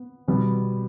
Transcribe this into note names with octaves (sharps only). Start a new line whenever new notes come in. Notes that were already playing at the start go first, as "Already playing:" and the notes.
Already playing: B3
B2 G3 B3